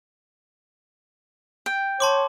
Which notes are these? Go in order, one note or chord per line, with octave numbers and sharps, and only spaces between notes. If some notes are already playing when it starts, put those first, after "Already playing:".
G5
C#5 A5 C6 D6